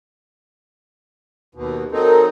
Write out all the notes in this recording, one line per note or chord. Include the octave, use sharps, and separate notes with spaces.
D#2 B2
F#3 C4 D#4 A4 A#4